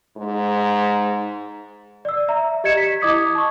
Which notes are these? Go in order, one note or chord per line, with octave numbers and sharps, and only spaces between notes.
G#2
D5 E6
E5 A#5
G4 D#5 G#6 C#7 E7
B6
E4 D#5 D6 D#6 G#6
A5 C#6